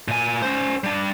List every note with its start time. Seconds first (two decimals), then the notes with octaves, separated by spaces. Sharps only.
0.08 A#2 G#5
0.42 C#4 C5
0.84 G3 D4